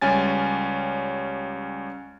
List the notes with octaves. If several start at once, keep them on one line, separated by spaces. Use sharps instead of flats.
C#2 G3 C#4 G#5 A6